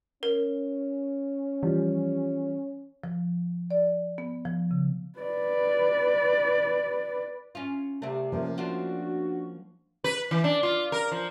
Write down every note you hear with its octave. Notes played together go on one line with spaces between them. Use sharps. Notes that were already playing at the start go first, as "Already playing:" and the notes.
C#4 A#4
E3 F3 G3
F3
D5
B3
F3
C#3
B4 D5
C#4 F4
C2 C3 A3 C4
F3 A#3 C#4
D4 F4 F#4 C5
B4
E3
D4
F4
A#4
F3